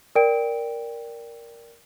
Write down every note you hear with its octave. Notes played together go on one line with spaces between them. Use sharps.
A#4 D5 G5 D7